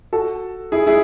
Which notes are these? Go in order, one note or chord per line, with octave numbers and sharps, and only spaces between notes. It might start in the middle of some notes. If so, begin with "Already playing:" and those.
F#4 A4
E4 G#4
E4 G#4